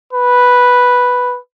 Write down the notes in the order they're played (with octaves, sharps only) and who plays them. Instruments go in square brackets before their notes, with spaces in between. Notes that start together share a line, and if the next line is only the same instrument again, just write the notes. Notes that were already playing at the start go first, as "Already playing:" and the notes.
[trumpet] B4